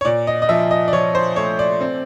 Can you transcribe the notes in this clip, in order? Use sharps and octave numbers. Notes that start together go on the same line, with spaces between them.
C#5
A#2 D5
D#5
D#5
F3 E5
D#5
D5
F3 C#5
C5
A3 C#5
D5
C4